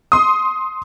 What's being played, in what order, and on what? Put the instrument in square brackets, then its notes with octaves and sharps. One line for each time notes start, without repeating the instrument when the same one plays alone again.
[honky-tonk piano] C6 D#6